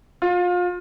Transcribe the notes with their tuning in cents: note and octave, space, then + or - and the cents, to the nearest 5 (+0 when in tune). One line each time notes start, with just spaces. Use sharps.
F4 +30